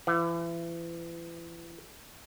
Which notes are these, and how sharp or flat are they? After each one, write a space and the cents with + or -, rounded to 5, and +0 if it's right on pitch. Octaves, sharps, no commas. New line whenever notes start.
E3 +35 F#5 -25